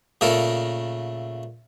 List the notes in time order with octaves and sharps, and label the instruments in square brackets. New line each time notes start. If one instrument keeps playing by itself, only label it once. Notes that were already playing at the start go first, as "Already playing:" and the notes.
[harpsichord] A#2 C#3 A3 A4 A#4